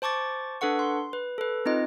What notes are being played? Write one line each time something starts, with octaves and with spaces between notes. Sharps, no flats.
C5 A5 C#6 D6 A6
D4 A4 B4 F#5 C#6
C6
B4
A4 B4
C4 D#4 F4 D#5